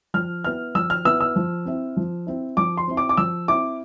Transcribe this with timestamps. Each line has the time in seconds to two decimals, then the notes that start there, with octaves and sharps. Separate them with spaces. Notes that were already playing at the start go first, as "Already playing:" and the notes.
0.14 F3 F6
0.44 B3 E4 F6
0.75 F3 E6
0.90 F6
1.05 B3 E4 E6
1.21 E6
1.36 F3
1.66 C4 E4
1.97 F3
2.27 C4 E4
2.57 F3 D6
2.78 C6
2.88 C4 E4
2.97 D6
3.09 D6
3.17 F3 E6
3.48 C4 E4 D6